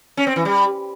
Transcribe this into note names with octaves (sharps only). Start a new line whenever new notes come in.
C#4
C4
E3
G3